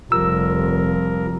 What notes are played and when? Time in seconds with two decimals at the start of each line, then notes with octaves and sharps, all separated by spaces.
0.12 F1 F3 G3 A#4 E6